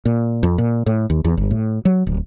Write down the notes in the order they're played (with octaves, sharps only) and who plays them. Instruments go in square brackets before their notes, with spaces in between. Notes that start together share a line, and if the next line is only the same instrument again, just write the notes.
[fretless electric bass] A#2
F2
A#2
A2
D#2
E2
G1
A2
F#3
D1